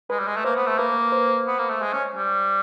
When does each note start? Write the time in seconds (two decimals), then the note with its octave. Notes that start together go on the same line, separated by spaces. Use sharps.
0.10 G#3 B4
0.19 G3
0.27 G#3
0.36 A3
0.45 A#3 C5
0.56 B3
0.67 A3
0.78 A#3 B4
1.12 C5
1.47 B3
1.59 A#3
1.70 A3
1.82 G#3
1.93 C#4
2.15 G3